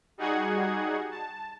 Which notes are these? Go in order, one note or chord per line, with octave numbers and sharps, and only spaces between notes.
G3 D#4 F#4 G#4 F#5 G#6
A5